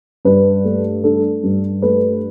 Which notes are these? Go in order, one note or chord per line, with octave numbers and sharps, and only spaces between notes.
G2 B4
A3
D4 A4
G2
A3 B4